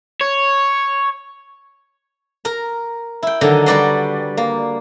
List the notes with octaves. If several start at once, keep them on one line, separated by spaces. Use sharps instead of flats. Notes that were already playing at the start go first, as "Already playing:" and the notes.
C#5
A#4 A#5
E4 G5
D3 D#3 F#3 D#4 D#5
G3 F#4 B4 D5 A#5 C6
A#3